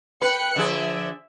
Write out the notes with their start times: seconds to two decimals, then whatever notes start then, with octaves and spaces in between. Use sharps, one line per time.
0.22 B4 G5 F#6 C#7
0.56 D3 F3 G#4 E5